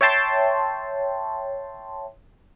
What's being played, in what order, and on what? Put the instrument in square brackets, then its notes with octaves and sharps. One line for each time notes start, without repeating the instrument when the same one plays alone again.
[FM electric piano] C#5 E5 G5 A5 C6